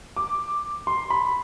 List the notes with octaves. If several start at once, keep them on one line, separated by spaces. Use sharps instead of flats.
D6
C6
B5